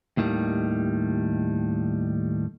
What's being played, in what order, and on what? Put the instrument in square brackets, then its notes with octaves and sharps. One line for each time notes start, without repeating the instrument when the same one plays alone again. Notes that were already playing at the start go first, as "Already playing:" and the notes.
[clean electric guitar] D#2 A2 D#3 G3